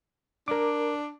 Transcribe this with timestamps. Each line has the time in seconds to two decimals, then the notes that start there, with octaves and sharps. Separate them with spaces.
0.48 D4 A#4 D6